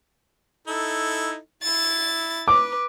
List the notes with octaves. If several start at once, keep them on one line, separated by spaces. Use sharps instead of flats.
D#4 E4 A4
E4 A6
B4 D6